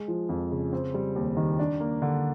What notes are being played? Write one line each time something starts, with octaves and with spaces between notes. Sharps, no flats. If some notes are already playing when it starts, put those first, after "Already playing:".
Already playing: G#3
F3
F2
C#3
C4
G3
D#2
D#3
D4
A#3
D3